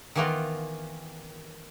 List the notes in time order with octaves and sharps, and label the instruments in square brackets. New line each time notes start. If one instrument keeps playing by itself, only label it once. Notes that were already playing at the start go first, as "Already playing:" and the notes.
[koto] D#3 E3 A#3 B3 F4